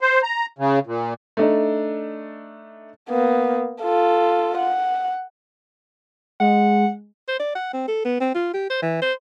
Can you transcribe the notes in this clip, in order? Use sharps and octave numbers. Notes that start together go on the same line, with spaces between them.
C5
A#5
C#3
A#2
A3 D4 D#4
A#3 B3
F4 A4
F#5
G#3 F#5
C5
D5
F#5
C4
A4
B3
C4
F4
G4
C5
E3
C5